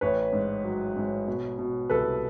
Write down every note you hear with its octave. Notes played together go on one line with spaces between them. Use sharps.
A1 B4 C#5
G#2
F#3
G#2
B2
B2
C2 A4 B4